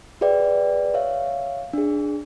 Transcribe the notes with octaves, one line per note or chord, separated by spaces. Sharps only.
F#4 G#4 B4 D5 E5 G5
C#5 E5 F5
D4 G#4